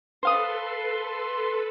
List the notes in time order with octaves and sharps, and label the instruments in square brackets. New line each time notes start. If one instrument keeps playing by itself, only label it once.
[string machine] A4 B4 [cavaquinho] C5 F5 D#6 [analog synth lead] C6